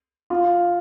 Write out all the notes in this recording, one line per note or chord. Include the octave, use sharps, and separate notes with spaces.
F4